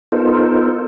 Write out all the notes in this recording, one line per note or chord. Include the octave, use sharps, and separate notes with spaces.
B3 D#4 F4 A4 A#4 C5